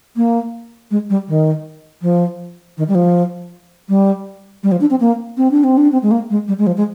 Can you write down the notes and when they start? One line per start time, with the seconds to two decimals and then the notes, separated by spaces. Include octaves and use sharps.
0.16 A#3
0.91 G#3
1.10 G3
1.28 D#3
2.02 F3
2.77 D#3
2.88 G3
2.95 F3
3.89 G3
4.63 G3
4.72 F3
4.81 D4
4.90 C4
5.00 A#3
5.37 C4
5.51 D4
5.64 C4
5.77 D4
5.92 C4
6.03 G#3
6.11 A#3
6.30 G#3
6.48 G3
6.58 G#3
6.67 F3
6.77 G#3